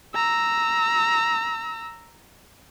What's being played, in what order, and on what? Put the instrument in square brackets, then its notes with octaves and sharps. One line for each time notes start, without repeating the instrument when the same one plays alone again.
[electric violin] A#5 E6